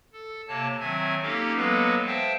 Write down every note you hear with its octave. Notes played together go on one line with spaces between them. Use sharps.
A4
C3 A#3 C#5 A5
D#3 F#3 C4 E5 G#5 G#6
A#3 C#4 D#4 G4 A4 F5
F#3 G#3 A#3 B3 A4 B4
C5 E5 F5 G5 A5